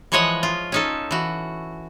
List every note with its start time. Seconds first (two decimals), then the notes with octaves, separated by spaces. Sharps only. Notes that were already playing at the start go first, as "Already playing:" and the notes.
0.12 E3 F3 G#3 C#5 D#5 F#5
0.43 F4
0.72 C#4 D#4 A4
1.11 E3 F#4